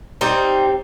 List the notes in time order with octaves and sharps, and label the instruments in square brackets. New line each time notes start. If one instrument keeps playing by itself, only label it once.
[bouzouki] G3 C4 D#4